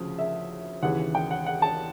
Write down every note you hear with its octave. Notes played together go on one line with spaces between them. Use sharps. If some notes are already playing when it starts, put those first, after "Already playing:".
Already playing: D2 C#3 F3
E5
D#2 C#3 E3 F#5
G5
F#5
F#5
A5